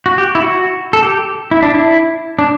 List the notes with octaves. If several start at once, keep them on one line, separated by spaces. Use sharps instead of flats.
F#4
G4
E4
F#4
A4
G4
E4
D4
E4
D4